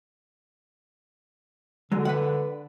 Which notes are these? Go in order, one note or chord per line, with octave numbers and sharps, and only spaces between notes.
D3 F#3 G#3
B4 F#5